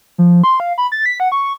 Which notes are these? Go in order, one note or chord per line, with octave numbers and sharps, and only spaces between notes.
F3
C6
F5
B5
A6
B6
F#5
C#6